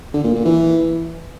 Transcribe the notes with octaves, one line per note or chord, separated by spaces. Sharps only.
D3
A#2
A#2
E3